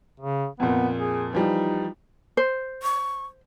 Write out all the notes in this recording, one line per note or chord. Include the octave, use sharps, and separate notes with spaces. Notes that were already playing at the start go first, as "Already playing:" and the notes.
C#3
F2 A#2 B3
G#4
E3 F3 G3 D#4
C5
C#6